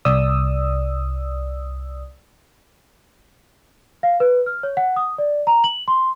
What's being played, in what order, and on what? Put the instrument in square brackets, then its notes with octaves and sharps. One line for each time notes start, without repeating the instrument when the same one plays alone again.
[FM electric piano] C2 D5 D#6 E6
[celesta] F5
B4
F6
C#5
F#5
D#6
D5
A#5
F#7
C6